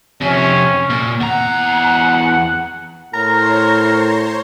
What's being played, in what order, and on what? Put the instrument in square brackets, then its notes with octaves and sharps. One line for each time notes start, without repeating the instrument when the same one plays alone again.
[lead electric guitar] F2 C3 [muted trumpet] C#4
[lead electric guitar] A#2
[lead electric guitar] E2 A#5 [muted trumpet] F#5
[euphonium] A2 [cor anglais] A#4 [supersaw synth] C5 C#5 C6 [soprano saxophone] A#5